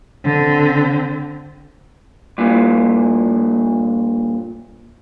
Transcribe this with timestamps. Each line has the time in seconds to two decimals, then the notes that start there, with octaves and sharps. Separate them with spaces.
0.24 D3 C4
2.38 G2 A#2